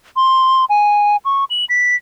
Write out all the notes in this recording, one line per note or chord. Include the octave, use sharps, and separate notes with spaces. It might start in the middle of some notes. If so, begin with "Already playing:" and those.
C6
G#5
C#6
F#7
B6